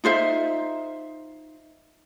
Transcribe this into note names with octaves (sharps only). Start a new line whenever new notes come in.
D#4 F4 C5 E5